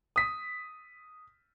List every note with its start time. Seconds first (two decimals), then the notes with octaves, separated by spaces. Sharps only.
0.16 D#6 B6